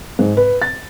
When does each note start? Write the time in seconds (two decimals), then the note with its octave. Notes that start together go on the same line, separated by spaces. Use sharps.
0.19 G#2
0.37 B4
0.62 A6